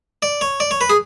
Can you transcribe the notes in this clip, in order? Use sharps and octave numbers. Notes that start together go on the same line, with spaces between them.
D5
C#5
D5
C#5
B4
G#4